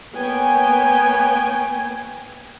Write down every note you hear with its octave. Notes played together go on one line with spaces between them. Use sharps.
A#3 B3 C#5 G5 G#5